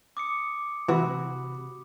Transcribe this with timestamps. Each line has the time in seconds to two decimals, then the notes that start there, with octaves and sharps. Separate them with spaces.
0.17 D6 D#6 C#7
0.89 C3 E3 F#4 B5